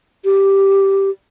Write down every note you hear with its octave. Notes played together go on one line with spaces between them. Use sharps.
G4